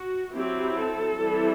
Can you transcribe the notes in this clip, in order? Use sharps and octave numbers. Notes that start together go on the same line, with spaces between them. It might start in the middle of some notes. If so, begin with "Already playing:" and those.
Already playing: F#4
F#3 C4 E4 G4
A4
E3 G3 C4 E4